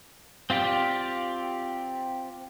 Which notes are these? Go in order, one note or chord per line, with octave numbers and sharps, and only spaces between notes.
C4 F4 G4 D5 F5